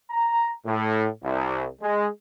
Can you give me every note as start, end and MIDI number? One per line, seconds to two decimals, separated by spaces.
0.11 0.51 82
0.66 1.07 45
1.23 1.68 36
1.82 2.08 56